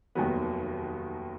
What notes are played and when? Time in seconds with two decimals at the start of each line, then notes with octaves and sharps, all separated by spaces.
0.15 F1 D#2 D#3 F#3 B3